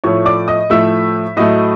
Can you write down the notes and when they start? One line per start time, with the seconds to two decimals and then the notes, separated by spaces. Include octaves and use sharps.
0.04 A2 F3 A3 C#5 C#6
0.25 D5 D6
0.48 D#5 D#6
0.70 A2 F3 A3 E5 E6
1.36 A2 F#3 A3 D#5 D#6